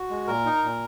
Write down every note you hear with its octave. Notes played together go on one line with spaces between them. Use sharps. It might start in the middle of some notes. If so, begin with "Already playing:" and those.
Already playing: F#4
G#3
A#2 A#4
D#4
A#2